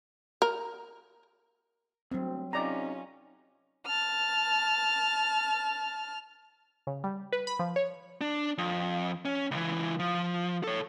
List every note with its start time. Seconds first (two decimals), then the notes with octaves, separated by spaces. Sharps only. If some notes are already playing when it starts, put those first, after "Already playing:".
0.42 A#4
2.12 D2 G2 F#3 C4
2.53 C3 C#4 D#4 F4 D5 A#5
3.86 A5 F6
6.87 C#3
7.04 G3
7.32 B4
7.47 B5
7.59 F3
7.76 C#5
8.21 D4
8.58 F2
9.25 C#4
9.51 C#2 E3
9.99 F3
10.64 A4 C#5